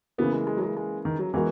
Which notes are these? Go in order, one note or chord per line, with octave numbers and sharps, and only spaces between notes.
C#3 E3 A#3 B3
G#3
G#3
F#3
G#3
G#3
D#3
F#3
E3 G#3 B3 F#4 A#4